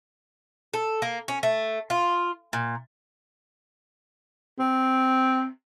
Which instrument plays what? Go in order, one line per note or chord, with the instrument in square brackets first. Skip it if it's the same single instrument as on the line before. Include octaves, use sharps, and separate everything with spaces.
[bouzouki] A4
A#3
C#4
A3
F4
A#2
[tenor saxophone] C4